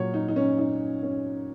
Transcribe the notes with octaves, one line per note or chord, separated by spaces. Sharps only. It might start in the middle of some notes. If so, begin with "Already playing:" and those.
Already playing: A#2 F#3 C#5
D#4
D#4
C#4
D#4
C#4